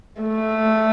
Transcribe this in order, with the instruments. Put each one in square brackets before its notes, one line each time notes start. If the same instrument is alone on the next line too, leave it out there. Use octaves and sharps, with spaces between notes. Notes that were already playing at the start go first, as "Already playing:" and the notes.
[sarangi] A3